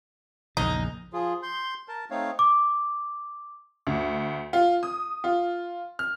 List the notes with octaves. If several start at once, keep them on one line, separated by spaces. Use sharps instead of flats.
A#1 E2 C#3 D#4
F3 F4 G#4
C6 G6
A#4 A5
A3 C4 D#4 C#5 F5
D6
D2
F4
D#6
F4
F6